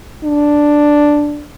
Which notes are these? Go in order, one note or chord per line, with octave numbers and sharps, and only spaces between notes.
D4